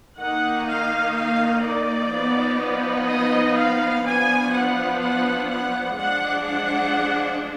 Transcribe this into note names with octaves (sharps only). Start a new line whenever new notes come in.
D#3 A#3 D#4 F#5
F5
F5
D5
F3 B3 D#4
D#5
F5
F3 B3 D4 G#5
F#5
F#5
F#5
F3 G#3 D4 F#5
F#5